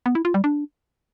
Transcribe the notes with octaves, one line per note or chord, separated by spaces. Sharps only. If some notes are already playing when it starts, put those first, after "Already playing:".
B3
E4
F4
G3
D4